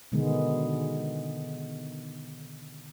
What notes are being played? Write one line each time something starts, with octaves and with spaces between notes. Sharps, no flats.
B2 D3 D#3 G#3 B3